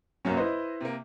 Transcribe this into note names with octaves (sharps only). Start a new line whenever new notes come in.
C2 F#2 F#3 A#3 C#4
E4 B4 C5 D#5
C3 A#3